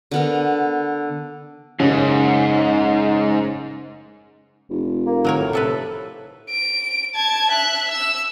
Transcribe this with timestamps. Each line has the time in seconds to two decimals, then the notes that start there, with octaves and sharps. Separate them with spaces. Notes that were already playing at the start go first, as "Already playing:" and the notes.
0.11 D3 B3 A#4
1.79 F#1 G#2 C#3 C#4
4.70 F1
5.06 A#3
5.25 F#3 A#4 C#5
5.38 A2
5.53 C3 A4 B4
6.51 D7
7.15 A5 G#6
7.51 E5 F#6
7.91 E6